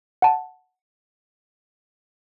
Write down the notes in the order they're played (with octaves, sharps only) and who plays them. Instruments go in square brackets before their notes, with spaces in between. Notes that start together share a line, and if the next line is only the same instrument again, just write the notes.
[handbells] F#5 A5